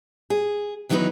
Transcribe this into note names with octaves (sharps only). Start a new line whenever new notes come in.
G#4
D#3 E3 F#3 B3 D#4 B4